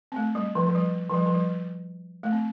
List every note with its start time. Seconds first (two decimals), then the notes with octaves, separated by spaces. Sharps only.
0.12 C4
0.16 A3
0.35 G3
0.55 F3
0.67 F3
0.75 G3
1.10 F3
1.14 G3
1.26 F3
1.34 G3
2.23 A3
2.32 C4